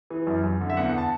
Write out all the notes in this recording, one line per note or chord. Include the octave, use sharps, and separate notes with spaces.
E3
F#2
F#2
D3
E5
E2 F#5
A5